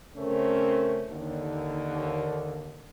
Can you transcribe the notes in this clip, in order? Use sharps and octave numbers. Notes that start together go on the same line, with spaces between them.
C#3 A3 C4 C#4 A#4
D#2 D3